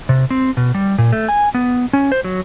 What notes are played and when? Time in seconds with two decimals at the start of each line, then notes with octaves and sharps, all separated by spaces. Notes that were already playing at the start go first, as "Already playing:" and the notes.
0.09 C3
0.31 C4
0.57 B2
0.75 G3
0.98 A#2
1.13 A3
1.29 G#5
1.54 B3
1.93 C#4
2.12 C5
2.24 F#3